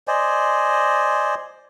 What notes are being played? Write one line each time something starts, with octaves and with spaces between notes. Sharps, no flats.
C5 D5 D#5 G#5